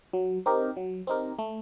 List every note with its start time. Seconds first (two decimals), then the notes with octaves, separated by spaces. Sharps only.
0.13 F#3
0.46 C4 D#4 G4 A#4
0.77 F#3
1.07 C4 D#4 G4 A#4
1.39 A3